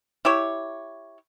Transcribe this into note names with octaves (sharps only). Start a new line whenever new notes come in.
E4 G4 C#5